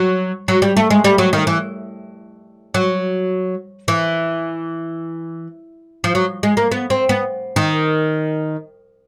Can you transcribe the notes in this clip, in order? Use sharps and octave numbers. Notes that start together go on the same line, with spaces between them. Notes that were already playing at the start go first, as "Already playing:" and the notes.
Already playing: F#3
F#3
G3
A3
G#3
G3
F#3
D#3
E3
F#3
E3
F3
F#3
G#3
A#3
B3
C4
B3
D#3